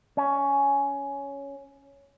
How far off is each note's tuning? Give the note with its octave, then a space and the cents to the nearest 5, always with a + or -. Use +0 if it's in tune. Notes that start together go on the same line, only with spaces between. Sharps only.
C#4 +10